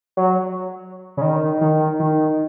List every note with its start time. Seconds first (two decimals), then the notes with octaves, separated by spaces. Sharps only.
0.17 F#3
1.17 C#3
1.22 D#3
1.61 D#3
2.00 D#3